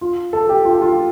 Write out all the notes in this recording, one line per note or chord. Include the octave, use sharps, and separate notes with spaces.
F4
A4
G4
F4
G4
F4